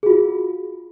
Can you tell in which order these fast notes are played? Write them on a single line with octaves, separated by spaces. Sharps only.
G#4 F#4 F4